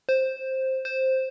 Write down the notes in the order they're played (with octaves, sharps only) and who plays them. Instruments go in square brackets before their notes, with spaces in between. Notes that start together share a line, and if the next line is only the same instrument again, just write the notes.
[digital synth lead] C5
C5